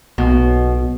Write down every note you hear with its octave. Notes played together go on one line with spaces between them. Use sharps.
B1 B2